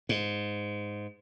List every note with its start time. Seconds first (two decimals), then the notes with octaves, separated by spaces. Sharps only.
0.09 G#2